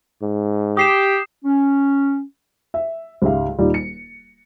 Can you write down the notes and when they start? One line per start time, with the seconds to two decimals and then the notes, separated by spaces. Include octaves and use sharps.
0.22 G#2
0.77 G4 D#6 C7 E7
1.45 C#4
2.74 E5
3.22 C#2 G#2 G4 E5 F5
3.58 D#1 G3 D#4 F4 D5
3.74 C#7